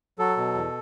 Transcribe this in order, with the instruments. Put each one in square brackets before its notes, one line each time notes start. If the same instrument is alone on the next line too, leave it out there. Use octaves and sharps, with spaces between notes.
[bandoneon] F#3 A4
B2
E2